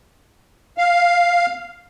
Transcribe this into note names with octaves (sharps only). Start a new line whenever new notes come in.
F5